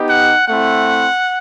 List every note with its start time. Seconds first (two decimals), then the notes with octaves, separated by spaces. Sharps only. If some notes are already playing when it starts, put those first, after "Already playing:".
Already playing: B3 D#4 G4
0.09 F#5
0.47 A3 C4 E4 F#5